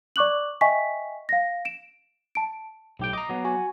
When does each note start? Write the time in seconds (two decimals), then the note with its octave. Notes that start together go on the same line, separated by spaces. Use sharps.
0.16 D5 C#6 D6 F#6 F#7
0.61 D#5 E5 G5 G#5 C#6 B6
1.29 F5 A#6
1.65 D7 E7
2.35 A5 D7
2.99 B1 A2 G4 G5
3.13 D#5 A#5 D6
3.29 F#3 B3
3.45 F#4 G#5